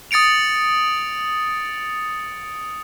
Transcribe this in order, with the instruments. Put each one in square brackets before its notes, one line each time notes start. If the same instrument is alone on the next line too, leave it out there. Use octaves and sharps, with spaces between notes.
[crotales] D#6 A6 C#7 D7 F7